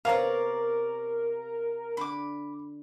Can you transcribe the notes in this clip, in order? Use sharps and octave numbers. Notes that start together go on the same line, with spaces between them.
C3 B3 A#4 C#5 D5 F5 A#5
D3 B5 D6